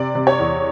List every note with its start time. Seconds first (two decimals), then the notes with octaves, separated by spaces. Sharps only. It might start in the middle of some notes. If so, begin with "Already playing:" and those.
Already playing: C3 D5
0.15 C3
0.27 C#5
0.39 E2